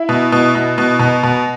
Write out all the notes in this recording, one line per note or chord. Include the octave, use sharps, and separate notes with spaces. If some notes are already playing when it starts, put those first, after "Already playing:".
Already playing: E4
B2
B2
B2
B2
B2
B2